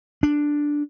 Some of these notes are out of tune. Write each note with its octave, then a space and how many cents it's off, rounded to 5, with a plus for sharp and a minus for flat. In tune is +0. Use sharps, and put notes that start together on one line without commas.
D4 +0